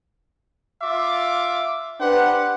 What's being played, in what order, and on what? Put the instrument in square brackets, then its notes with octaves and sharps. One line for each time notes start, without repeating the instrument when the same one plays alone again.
[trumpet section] F4 E5 D6
[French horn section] D4 B4 [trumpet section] G4 C5 F#5